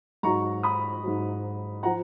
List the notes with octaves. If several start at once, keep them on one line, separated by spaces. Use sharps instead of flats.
G#2 F#3 A#5 C#6
B5 D#6
G#2 F#3
F3 F#5 A#5